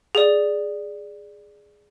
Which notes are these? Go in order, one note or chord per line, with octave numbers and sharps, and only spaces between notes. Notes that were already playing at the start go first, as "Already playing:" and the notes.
G#4 D5